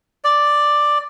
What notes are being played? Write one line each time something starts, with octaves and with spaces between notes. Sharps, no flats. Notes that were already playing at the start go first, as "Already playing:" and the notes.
D5